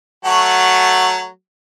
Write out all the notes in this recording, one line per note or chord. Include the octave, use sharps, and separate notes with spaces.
F#3 A3 F#4